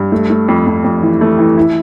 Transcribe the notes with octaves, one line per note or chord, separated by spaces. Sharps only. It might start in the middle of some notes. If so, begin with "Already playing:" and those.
Already playing: G2
A3
A3
F2
F2
F2
E3
A3
E3
E4